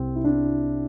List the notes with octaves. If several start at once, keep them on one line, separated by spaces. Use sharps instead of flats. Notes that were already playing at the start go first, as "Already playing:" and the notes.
Already playing: C2 C3 C4
E4
D4